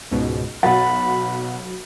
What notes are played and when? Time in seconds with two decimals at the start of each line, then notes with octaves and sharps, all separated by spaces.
0.11 C#2 G#2 B2
0.63 B1 F#3 F#4 F#5 B5 A6